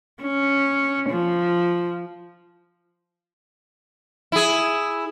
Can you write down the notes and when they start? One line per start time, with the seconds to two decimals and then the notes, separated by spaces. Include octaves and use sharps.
0.23 C#4
1.10 F3
4.32 E4 G#4